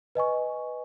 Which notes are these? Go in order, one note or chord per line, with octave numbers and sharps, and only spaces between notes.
B4 D#5 G#5 C#6